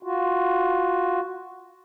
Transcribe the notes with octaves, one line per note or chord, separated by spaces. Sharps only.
F4 F#4